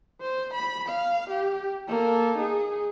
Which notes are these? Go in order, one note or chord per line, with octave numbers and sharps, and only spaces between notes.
C5
B5
F5
G4
A#3 A4
D#4 G#4